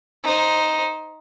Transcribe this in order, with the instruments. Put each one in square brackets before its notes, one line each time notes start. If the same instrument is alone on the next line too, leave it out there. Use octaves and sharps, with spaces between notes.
[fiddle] D#4 C5